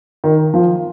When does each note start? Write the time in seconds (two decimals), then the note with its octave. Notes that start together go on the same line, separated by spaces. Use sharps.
0.24 D#3
0.54 F3